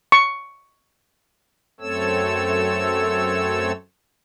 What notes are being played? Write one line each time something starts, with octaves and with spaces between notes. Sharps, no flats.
C#6
F#2 A3 C4 A4 C#5 E6